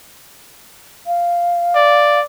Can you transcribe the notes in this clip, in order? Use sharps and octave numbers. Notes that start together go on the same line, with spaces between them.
F5
D5